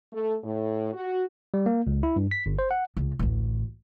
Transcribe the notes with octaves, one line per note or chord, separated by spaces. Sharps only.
A3
A2
F#4
G3
A#3
C#2
E4
G2
B6
G1
C5
F#5
C#2
A1 D2